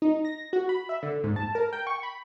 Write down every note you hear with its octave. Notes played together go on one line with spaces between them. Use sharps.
D#4
A#6
F#4
B5
E5
D3
G#2
A5
A#4
G5
C#6
B5